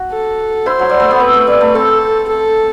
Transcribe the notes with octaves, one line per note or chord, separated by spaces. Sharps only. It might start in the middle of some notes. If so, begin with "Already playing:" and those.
Already playing: F#4
A4
E4 C5
F#3
G3
A3
B3
C4 B4
A3
G3
A3
C4 A4
A4